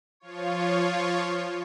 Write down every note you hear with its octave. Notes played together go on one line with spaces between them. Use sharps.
F3 F4 C#5